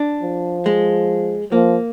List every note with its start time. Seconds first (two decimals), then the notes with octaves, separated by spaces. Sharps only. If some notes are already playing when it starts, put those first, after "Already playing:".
Already playing: D4
0.22 F3
0.66 G#3
1.52 F3 A#3